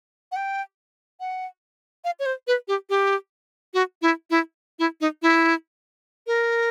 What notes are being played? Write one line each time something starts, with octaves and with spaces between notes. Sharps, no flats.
F#5
G5
F#5
F5
C#5
C5
B4
G4
G4
F#4
E4
E4
E4
D#4
E4
A#4